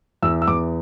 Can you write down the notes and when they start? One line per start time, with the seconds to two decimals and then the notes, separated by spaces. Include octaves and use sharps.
0.23 E2 E6
0.42 E6
0.47 E2 D6